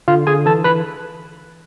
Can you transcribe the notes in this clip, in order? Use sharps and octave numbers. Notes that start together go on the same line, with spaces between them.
D3 F4 F5
D3 G#4 G#5
E3 A4 A5
E3 B4 B5